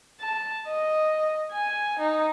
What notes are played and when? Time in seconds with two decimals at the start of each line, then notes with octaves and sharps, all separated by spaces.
0.21 A5
0.68 D#5
1.52 G#5
1.99 D#4